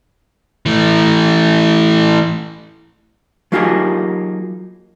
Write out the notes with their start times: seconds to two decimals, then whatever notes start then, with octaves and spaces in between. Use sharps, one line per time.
0.66 E3 A3
3.52 F#3 A#3 D#4 F4 G4 G#4